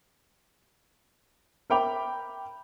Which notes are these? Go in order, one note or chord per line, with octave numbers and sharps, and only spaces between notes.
A#4 E5 G5 B5 D6 F7